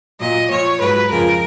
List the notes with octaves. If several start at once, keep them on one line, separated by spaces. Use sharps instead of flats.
A#2 F#3 D#5
A#2 F3 C#5
G#2 F#3 B4
F2 C#3 F3 A#4